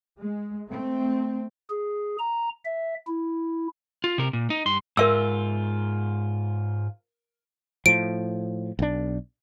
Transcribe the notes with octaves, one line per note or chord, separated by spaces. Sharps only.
G#3
A3 C4
G#4
A#5
E5
E4
F4
C3 A#4
A#2
D#4
G2 C6
G#2 F4 A#4 E5 E6
A2 F3 D7
B1 D4